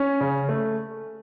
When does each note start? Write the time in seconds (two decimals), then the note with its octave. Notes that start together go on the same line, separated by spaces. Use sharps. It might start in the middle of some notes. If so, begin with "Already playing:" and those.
Already playing: C#4
0.21 C#3
0.49 A3